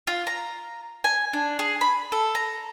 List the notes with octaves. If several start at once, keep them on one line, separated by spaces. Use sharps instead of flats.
F4
A#5
G#5
D4
G#4
B5
A4
A#5